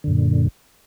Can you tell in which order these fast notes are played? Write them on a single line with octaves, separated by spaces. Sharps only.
D3 F#2 A#2